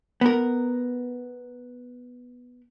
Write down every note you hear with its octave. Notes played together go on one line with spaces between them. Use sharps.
B3 A#4